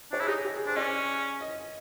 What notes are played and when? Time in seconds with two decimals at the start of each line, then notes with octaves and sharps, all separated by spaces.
0.12 D4 C#5
0.20 E4 G#4
0.28 D#4 G4
0.37 G#4
0.45 G4
0.55 G#4
0.66 D4 C5
0.76 C#4 D5
1.41 D#5